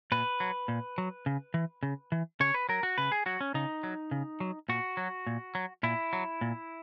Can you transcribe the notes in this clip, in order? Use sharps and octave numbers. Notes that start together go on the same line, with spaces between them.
A#2 B4
F#3
A#2
F#3
C#3
E3
C#3
E3
C#3 C#5
B4
F#3 A#4
F#4
C#3 B4
G#4
F#3 F#4
C#4
C#3 D#4
F#3
C#3
F#3
A#2 F#4
F#3
A#2
F#3
A#2 E4
F#3
A#2